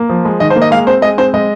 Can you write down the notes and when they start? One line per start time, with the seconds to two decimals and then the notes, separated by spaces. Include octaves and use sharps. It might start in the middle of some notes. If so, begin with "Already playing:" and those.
Already playing: A#3
0.09 F3
0.25 G#3
0.40 D#3 D#5
0.50 C5
0.56 A#3
0.62 D#5
0.71 G#3 F5
0.87 C4 C5
1.02 G#3 D#5
1.18 C4 C5
1.34 G#3 D#5